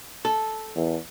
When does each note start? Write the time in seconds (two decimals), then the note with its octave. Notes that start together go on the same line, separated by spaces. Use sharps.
0.25 A4
0.76 E2